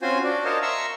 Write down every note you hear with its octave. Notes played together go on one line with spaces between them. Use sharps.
C4 C#4 F4 F#4 C5 G#5
D4 F#4 D5
A#4 C5 C#5 D#5 F5 A5
E5 A#5 C6 C#6 E6